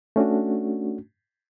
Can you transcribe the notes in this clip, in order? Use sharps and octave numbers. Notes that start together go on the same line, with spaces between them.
A3 C#4 D4 F#4